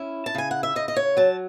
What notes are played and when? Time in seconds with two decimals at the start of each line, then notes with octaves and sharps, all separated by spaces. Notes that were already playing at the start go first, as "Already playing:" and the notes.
Already playing: C#4 E4
0.26 A5
0.35 C#3 G#5
0.51 F#5
0.63 E5
0.75 C#3 D#5
0.88 D#5
0.96 C#5
1.17 F#3 A5